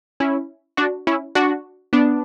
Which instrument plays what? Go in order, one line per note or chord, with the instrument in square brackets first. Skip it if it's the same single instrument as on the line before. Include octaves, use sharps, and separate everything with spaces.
[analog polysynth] C#4 E4
D4 F#4
C#4 E4
D4 F#4
B3 D4